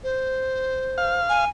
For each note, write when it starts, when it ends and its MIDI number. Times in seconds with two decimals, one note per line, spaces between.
0.04 1.19 72
0.98 1.45 77
1.29 1.49 80